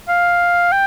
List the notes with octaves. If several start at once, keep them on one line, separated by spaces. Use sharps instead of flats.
F5
G5